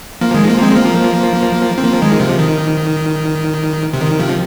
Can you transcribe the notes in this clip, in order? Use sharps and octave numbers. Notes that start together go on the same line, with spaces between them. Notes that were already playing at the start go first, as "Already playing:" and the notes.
F3 A#3
D#3 G#3
F3 A#3
G#3 C4
F3 A#3
C4
F3 A#3
D#3 G#3
C3 F3
D#3
C3
D#3
C3 F3